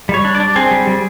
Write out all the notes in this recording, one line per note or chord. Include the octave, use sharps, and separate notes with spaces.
G3 C#5
D4
D5
D4
C4 G#4
G3
G3